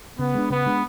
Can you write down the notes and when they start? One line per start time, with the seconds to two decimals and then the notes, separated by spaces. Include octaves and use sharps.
0.18 C#3 B3
0.34 G#3 D4
0.50 C#3 B3
0.66 G#3 D4